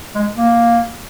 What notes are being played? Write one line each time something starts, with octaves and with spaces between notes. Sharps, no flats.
G#3
A#3